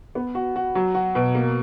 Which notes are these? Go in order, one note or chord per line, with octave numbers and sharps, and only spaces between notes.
B3
F#4
F#4
F#3
F#4
B2
A#3